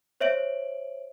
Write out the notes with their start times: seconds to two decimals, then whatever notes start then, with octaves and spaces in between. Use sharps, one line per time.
0.21 C5 C#5 E5 D7 F#7